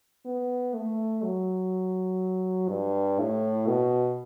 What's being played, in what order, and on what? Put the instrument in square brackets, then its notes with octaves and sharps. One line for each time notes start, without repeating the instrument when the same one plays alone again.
[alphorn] B3
A3
F#3
G2
A2
B2